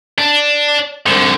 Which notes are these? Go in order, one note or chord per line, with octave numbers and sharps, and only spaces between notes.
D4
C2 D3